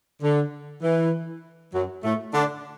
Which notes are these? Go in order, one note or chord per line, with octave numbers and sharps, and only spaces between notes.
D3
E3
F#2 F#3
A2 A3
D3 D4